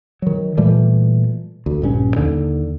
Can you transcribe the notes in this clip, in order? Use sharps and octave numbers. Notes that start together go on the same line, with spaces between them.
D#3 F#3
A#2 E3 G3 A3
D2
A#1 G2 C#4
D#2 D3